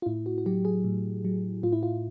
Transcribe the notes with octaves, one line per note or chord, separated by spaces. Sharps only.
F4
A2 E4
F#4
F#4
F#3 G4
G#4
A2
F#3
A2 F4
E4
F4